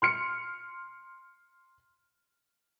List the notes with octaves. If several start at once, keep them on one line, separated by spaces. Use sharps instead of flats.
C6 F6 C#7